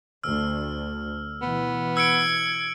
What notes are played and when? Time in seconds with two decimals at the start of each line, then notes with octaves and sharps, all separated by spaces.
0.23 D2 E6 F6
1.41 B2 E3 B3
1.97 E6 G#6 C#7 D7